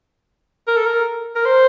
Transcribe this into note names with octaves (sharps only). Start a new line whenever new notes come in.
A#4
A4
A#4
A#4
C5